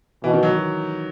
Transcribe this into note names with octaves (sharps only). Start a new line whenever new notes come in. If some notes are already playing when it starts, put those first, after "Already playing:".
B2 E3
D#3
F#3